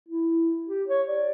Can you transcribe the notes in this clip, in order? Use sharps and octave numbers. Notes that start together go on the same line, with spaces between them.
E4
G4
C#5
D5